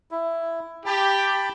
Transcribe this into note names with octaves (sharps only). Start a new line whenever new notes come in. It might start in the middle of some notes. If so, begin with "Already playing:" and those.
E4
G4 G5 A5 B5